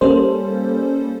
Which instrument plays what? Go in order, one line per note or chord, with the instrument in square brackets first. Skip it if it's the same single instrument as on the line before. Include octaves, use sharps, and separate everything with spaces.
[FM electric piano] G3 A#3 C#4 A4 C5